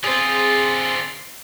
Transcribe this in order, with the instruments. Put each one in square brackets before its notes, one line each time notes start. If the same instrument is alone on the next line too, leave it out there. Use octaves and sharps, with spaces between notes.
[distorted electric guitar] D3 F4 [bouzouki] C4 G#4